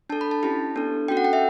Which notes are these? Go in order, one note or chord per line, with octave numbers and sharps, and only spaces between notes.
D4 A4 A5
B5
A5
C#4 E4 G4 A5
B3 D4 A4
C#4 F#4 A4 G5
F#5
G5
E5